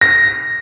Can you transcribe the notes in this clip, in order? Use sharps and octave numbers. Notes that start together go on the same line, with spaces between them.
A#6